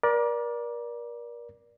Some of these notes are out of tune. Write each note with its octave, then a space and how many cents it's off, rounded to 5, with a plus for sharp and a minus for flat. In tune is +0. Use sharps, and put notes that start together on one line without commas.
A#4 +35 D5 +0